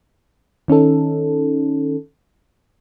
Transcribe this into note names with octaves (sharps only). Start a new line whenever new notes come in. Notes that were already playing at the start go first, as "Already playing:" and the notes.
D#3 C#4 D#4 A4